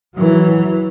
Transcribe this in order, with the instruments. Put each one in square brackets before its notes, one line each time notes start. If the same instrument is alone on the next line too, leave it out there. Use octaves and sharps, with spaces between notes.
[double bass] E3 F#3